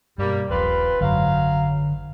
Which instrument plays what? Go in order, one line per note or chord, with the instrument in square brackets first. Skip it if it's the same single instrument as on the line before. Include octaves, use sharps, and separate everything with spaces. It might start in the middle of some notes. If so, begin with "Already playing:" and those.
[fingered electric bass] G2 B2 [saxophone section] G3 A#3
[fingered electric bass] D#1 A#1 [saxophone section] C4 F4 B4
[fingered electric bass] G#1 F#2 [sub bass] D3 [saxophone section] F#3 F5